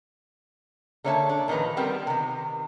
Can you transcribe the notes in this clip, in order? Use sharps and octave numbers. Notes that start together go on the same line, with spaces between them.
D3 A#3 C#5 E5 F#5 A5
D4
A#2 D#3 F3 B4 A#5
G3 B3 C4 A#4
C3 D#3